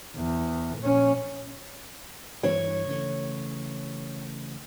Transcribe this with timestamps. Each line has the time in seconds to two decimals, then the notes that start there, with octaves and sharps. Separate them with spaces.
0.17 E2
0.79 A#1 C#4
2.43 G2 E3 D4 C#5
2.87 C#3 E3 A3